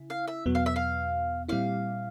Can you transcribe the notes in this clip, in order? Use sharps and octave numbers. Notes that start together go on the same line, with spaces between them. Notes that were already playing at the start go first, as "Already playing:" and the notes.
Already playing: C#3 E4
F5
E5
E2 B2 F#3 B3
F5
E5
F5
A#2 G3 C4 E4 F5